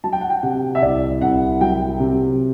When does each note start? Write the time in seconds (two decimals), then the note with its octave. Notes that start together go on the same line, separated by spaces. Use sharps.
0.04 F#3 A5
0.13 G5
0.21 F#5
0.30 G5
0.43 C3 F#5
0.75 E5
0.82 C2 D5
1.21 C2 F#5
1.61 F#3 G5
2.00 C3